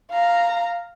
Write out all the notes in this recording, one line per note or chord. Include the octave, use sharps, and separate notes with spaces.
F5 A#5